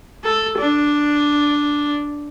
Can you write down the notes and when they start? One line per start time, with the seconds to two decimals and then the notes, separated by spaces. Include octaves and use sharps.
0.24 A4
0.58 D4